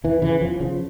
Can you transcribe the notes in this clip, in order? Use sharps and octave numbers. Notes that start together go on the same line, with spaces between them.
E2 E3
C#3 E3
E2 F3
C#3 F3